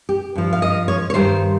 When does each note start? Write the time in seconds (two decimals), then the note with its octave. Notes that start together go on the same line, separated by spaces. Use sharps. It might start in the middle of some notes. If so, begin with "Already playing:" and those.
0.09 G4
0.35 G2 F3
0.53 F5
0.62 D#5
0.88 C#5
1.10 C#5
1.14 G2 D#3 G3 C5